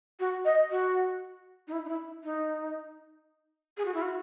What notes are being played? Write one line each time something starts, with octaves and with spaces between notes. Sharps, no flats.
F#4
D#5
F#4
D#4
E4
D#4
E4
D#4
G#4
F#4
E4
F#4